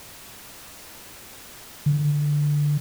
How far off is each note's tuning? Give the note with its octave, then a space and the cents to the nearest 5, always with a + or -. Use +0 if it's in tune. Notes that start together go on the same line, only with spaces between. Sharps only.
D3 +0